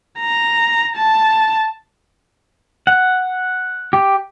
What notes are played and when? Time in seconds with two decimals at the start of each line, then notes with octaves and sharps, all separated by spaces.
0.20 A#5
0.97 A5
2.87 F#5
3.93 G4